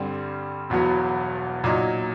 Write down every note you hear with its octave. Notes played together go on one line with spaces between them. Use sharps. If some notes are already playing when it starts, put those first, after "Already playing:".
Already playing: G2 D3 G3 C4
E1 E2 B2 F#3 B3
A#2 F#3 A#3 D#4